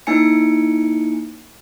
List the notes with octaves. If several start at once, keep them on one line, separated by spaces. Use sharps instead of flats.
A#3 D#4 E4 G#5 C#7